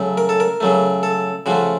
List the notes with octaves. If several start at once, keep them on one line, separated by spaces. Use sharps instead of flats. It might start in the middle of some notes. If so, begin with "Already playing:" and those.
Already playing: C#3 F#3 A3
A#4
A4
A#4
C#3 F#3 A3
A4
C#3 F3 A3 F#4